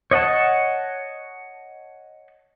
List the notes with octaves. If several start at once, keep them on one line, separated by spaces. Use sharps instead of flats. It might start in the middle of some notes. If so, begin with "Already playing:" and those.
C#5 D#5 F#5 A5